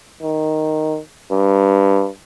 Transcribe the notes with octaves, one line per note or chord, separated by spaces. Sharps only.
D#3
G2